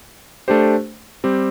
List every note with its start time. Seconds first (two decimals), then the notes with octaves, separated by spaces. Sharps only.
0.48 A3 D4 G4 C5
1.24 G3 C4 G4